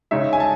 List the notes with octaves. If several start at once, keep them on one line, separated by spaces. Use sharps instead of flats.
C#3 G#3 D#4 E5
G#5
A5